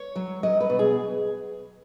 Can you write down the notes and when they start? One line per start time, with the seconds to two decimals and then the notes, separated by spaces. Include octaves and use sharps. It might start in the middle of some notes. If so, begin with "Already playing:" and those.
Already playing: C#5
0.16 F#3
0.43 F#3 D#5
0.60 B4
0.70 B2
0.79 G#4